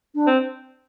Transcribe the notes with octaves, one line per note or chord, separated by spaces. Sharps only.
D4
C4